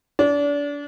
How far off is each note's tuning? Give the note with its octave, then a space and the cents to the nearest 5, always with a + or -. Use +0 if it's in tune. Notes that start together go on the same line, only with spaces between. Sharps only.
D4 -30